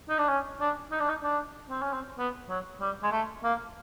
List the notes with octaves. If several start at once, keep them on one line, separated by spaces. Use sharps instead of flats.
D#4
D4
C#4
D4
D#4
D4
D#4
D4
C4
C#4
C4
B3
F#3
G3
G#3
A3
A#3